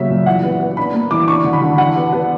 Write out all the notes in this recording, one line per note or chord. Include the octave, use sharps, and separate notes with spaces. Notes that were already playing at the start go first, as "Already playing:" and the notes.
Already playing: C#3 F#3 A#3 E5
A#2
E3 F#5
B3
B3
D4 B5
A#3
E3 D6
D4 C#6
D3
B5
D3
E3 F#5
B3
B3